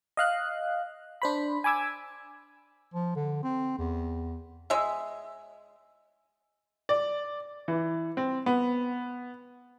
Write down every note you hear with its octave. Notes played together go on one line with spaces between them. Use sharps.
D#5 F5 F#6
D4 C5 B5
G#5 B5 D6 E6 G#6
F3
D3
C4
E2
G#3 E5
D5
E3
C4
B3